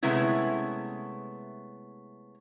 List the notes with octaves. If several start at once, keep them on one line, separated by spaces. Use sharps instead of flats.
C3 G#3 A3 B3 C#4 E4